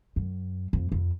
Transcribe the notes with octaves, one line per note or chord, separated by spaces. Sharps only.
F#2
F2
F2